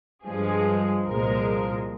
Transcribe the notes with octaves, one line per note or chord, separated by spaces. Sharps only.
G2 F3 G#3 G#4
C2 A#2 F3 G#3 A#4